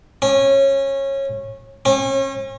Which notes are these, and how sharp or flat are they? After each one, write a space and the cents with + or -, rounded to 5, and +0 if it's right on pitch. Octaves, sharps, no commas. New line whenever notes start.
C#4 -20
C#4 -35